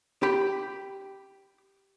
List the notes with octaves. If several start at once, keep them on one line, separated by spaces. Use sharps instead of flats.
G4 B5